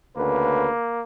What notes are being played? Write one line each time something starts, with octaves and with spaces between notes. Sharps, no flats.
D2 C#3 A#3 B4